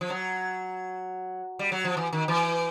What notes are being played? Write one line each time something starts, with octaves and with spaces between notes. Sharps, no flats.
F3
F#3
G3
F#3
F3
E3
D#3
E3